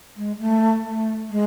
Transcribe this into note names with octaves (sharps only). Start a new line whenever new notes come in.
G#3
A3
A3
G#3